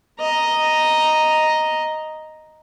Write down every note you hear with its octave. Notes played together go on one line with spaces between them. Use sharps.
D#5 A#5